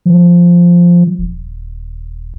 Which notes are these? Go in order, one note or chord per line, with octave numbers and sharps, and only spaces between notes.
F3
D#1